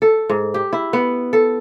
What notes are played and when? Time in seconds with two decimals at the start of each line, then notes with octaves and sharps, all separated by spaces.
0.02 A4
0.30 G#2
0.54 G4
0.73 E4
0.93 B3
1.33 A4